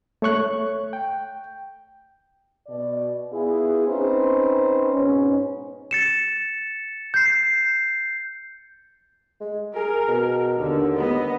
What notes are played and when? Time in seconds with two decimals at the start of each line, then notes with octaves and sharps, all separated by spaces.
0.22 A3 C#5 C#6 F#6
0.93 G5
2.67 B2 D5
3.31 B3 E4 F4 G#4
3.87 C4 C#4 D#4 B4 C5
4.93 G#2 B2 C#4
5.91 A6 C#7 E7
7.14 G6 C7
9.41 G#3
9.76 G#4 A#4
10.08 B2
10.58 D#2 D3
10.99 B3 D#5